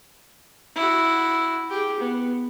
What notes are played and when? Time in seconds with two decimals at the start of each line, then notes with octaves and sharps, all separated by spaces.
0.76 E4 F#4
1.70 G4 G#4
1.99 B3